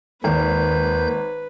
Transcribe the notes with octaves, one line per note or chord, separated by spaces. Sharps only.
G#1 D#2 D#3 B4 G6